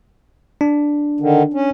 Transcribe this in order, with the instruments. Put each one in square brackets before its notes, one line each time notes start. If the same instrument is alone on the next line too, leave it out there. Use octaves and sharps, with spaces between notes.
[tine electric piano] D4
[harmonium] D3 D#3
C#4